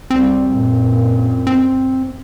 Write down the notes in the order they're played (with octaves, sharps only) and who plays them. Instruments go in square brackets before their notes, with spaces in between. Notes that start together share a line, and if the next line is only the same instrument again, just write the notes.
[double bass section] C#2 G3 [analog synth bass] C4
[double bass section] F#2 A#2
[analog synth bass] C4